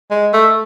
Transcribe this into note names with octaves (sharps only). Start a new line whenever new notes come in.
G#3
A3